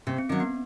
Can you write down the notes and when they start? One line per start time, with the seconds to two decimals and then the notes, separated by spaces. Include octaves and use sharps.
0.07 C3 C4
0.18 C4
0.29 D#3 F#3 C#4
0.40 B3